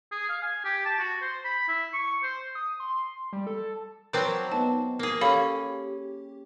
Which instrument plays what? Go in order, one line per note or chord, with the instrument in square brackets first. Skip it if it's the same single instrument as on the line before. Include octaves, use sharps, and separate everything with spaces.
[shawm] G#4
F5
G#5
G4
A5
F#4
C5
B5
E4
C#6
C5
[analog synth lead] D#6
C6
G3
A4
[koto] F#3 C4 D5 [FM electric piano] A#4 B4 A5
[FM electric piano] B3 D#4 [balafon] A5
[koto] A#3 G#4
[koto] C#4 [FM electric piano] G4 [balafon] A4 F5 B5